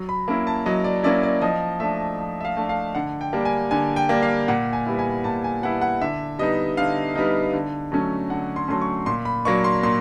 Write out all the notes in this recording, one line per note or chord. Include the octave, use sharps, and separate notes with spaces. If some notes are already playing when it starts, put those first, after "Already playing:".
Already playing: F#3
B5
A#3 C#4 E4
A5
F#3 D#5
D5
A#3 C#4 E4 D5
D5
F3 D#5
A3 D4 E5
F3
E5
F5
A3 D4
F5
D3 F#5
G5
G3 A#3 D4
G#5
D3 G#5
G5
G3 A#3 D4
F5
A#2 F#5
G#5
G3 B3 E4
G#5
A#2 A5
G#5
G3 B3 E4 F#5
F#5
D3 E5
G3 B3 D#4 D#5
D3 F5
G3 B3 D#4
D3
F#3 A3 C#4
D3 F#5
C6
F#3 A3 C#4 C6
C#6
A#2 C6
B5
F#3 A#3 D4 C#6
C6
A#2 C6